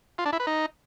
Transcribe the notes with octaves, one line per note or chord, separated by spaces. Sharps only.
F4
D4
E4
B4
D#4